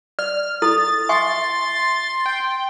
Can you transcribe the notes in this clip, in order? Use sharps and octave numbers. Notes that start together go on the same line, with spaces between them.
D5 F6
E4 A4 A6
E5 G#5 C6 C#6
G5